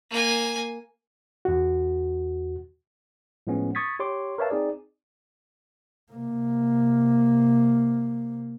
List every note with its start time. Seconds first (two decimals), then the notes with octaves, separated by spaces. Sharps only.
0.11 A#3 G#5
1.45 E2 F#4
3.47 A2 F3 G#3 B3 C#4
3.75 C#6 D#6 G#6 A6 B6
3.99 G4 C#5 C6 D6
4.38 A#4 B4 C#5 E5 F5 A5
4.50 C4 D#4 G#4 D5
6.12 C3 A#3